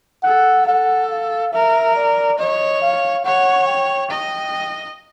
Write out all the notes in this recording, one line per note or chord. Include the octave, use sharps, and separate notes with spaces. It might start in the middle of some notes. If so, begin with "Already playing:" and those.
A4 F#5
A4 F#5
F5
A#4 E5
D5
C#5 D#5
F5
C#5 F#5
G5
D#5